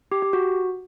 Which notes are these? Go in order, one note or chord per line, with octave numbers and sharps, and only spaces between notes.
G4
G4
F#4